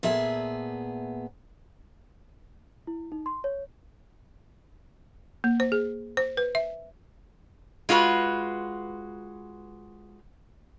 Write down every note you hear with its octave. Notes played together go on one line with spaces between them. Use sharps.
A#2 B3 G#4 E5 A5
E4
D#4
C6
C#5
A#3
C5
G#4
C5
B4
E5
G#3 F4 F#4 B4